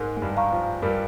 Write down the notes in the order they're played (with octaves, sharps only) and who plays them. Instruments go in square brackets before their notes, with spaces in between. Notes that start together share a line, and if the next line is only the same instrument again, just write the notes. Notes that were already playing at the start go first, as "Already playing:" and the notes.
Already playing: [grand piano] G#2 G#3 [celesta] A#4
[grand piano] G#3
G2 G3
[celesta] F5 A#5 C#6
[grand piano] F3
[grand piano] G2 G3 [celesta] A#4